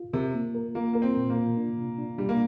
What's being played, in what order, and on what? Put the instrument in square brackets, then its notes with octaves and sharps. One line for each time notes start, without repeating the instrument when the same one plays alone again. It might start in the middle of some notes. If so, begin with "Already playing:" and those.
Already playing: [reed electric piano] F4
[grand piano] C3 [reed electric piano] A#4
[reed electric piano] A#3
A#4
[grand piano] A#3 [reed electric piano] F4
[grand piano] A#3 [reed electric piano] A#4
[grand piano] C4
[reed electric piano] A#2
[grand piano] A#3
[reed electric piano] F4
D4
C3
D4
[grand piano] G3 [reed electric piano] D4
[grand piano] A#3